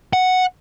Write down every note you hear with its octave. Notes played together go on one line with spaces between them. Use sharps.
F#5